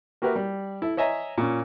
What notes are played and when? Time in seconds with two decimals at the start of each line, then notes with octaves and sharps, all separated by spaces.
0.22 A#3 F#4 G4 A#4 B4 E5
0.36 G3
0.82 E4 A4
0.97 C#5 D#5 E5 G#5 A#5
1.38 A#2 C#4